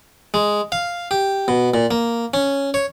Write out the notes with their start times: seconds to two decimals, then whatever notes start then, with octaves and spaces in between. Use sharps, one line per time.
0.34 G#3
0.72 F5
1.11 G4
1.48 B2
1.74 A#2
1.91 A#3
2.34 C#4
2.74 C#5